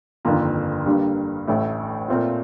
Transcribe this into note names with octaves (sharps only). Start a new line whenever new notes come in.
G1 F2 D#3 A#3 F4
G2 D3 G3 A#3
A1 A2 A3
A#2 A3 C4 F4